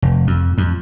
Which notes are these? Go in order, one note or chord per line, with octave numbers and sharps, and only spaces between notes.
F1
F2
F2